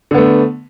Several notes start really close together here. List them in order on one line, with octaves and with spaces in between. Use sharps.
D3 B3 A3